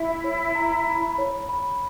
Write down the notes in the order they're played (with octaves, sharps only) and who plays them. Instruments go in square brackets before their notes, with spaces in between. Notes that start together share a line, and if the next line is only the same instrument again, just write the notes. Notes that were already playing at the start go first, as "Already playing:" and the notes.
Already playing: [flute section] E4 [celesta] E5
[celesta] C#5
A#5
B5
C#5
B5